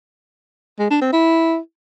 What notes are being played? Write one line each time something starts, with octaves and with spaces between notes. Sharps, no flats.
G#3
D4
C4
E4